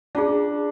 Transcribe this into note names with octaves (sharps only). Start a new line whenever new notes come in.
C#4 D4 F4 G#4